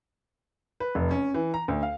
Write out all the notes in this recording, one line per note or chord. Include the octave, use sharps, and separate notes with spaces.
B4
F1
C#4
E3
A#5
D2
F5